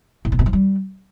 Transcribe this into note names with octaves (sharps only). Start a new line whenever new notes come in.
A2
A#2
B2
F3
G3